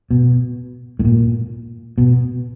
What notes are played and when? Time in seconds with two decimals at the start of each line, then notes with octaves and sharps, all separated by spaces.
0.11 B2
0.99 A2
1.05 A#2
1.98 B2